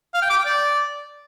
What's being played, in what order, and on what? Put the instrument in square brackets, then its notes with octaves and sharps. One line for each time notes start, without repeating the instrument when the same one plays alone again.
[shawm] F5
G5
D6
G5
D5